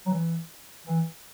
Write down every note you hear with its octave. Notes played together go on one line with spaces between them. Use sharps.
F#3
E3
E3